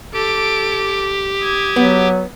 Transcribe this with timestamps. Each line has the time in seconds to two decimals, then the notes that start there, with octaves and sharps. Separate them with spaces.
0.14 G4 A4 D7
1.40 D#6 G#6
1.76 F#3 B3